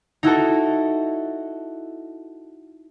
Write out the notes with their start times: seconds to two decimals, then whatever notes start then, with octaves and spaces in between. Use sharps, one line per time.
0.23 D#4 E4 F#4 A4